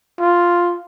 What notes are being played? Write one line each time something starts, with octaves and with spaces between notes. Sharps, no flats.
F4